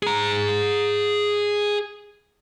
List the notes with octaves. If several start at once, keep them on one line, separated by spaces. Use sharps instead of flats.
G#4 A#5